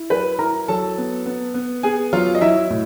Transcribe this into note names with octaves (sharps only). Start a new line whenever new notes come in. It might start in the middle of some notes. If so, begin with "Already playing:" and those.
Already playing: E4
F#3 B4 B5
E4 A#4 A#5
F#3 A4 A5
B3
B3
B3
B3 G#4 G#5
F#3 F4 F5
D#5
F#3 E4 E5
A2